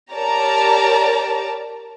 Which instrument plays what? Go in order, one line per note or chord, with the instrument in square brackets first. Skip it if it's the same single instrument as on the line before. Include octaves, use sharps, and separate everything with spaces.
[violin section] G4 A#4 C#5 D5 A5 A#5